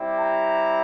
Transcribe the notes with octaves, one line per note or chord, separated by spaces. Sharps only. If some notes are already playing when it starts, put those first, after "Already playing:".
Already playing: G3 C4 E4 G4
A#5